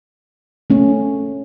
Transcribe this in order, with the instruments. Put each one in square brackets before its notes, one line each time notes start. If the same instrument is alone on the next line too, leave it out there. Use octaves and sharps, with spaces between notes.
[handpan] A3 C#4